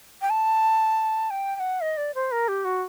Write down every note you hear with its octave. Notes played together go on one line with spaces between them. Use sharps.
G5
A5
G5
G5
F#5
D#5
D5
C5
A#4
G4
F#4